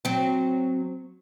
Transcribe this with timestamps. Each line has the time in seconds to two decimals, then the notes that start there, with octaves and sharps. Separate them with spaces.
0.05 F#3 C4